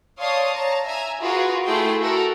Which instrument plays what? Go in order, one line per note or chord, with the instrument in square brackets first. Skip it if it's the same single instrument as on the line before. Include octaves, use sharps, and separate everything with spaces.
[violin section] C#5 D5 F5 A5 C6 D#6
C#5 A5 A#5
E5 G#5 A#5
F4 F#4 G#4 A#4 B4
A3 E4 F4 G#4 G5 C6
F#4 A4 A#4